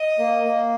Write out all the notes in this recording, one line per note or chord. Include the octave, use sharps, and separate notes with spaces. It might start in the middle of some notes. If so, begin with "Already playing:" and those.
Already playing: D#5 D#6
A#3
A#3